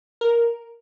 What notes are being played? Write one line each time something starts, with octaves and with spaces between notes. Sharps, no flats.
A#4